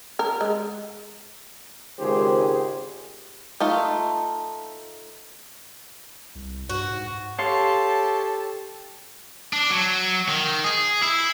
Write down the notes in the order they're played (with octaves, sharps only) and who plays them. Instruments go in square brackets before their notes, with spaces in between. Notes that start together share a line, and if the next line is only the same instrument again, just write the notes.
[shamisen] A#4
G#3
[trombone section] G#1 C#2 D#3 G4 G#4 C5
[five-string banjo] A3 D#4 F4
[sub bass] C2
[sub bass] G2 [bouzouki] F#4
[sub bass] G#2
[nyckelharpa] G4 A4 [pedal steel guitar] C#5 F5 C6 [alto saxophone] A5
[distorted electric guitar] D4
F#3
D#3
G#4
E4